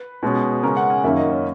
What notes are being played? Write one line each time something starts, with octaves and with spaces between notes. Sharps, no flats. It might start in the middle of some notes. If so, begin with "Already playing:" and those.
Already playing: B4
B2 G#3 C#4
C#3 G#3 C#4 A#4
F#5
G#5
F#2 D#3 A#3 C#4 E5
D#5
C#5